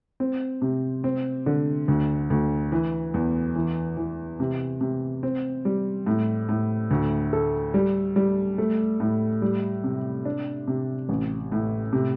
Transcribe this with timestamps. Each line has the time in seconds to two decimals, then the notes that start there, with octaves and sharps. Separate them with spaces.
0.20 C4
0.62 C3
1.04 C4
1.46 D3
1.88 D2
2.30 D2
2.72 E3
3.14 E2
3.56 E3
3.97 E3
4.40 C3
4.81 C3
5.23 C4
5.65 G3
6.06 A2
6.49 A2
6.91 D2
7.33 A4
7.74 G3
8.16 G3
8.58 A3
9.00 A2
9.42 G3
9.84 C3
10.25 D4
10.68 C3
11.09 A1
11.52 A2
11.93 C3